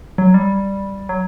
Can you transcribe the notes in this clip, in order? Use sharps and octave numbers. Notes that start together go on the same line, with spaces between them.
F#3
G3
F#3